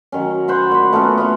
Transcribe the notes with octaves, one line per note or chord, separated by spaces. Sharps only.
D#3 F#3 C#4
C5 F#5 B5 C#6
A#2 B5
A3 B3 C#4 A#4
B3 C#4 F4